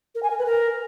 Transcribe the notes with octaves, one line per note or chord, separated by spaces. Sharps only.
A#4
G#5
A#4
B4
A#4